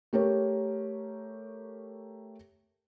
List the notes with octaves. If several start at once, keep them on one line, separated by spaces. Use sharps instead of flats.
A3 G4 A#4 C#5